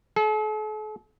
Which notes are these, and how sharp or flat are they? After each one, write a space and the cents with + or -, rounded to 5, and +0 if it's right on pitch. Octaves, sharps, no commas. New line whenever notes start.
A4 -45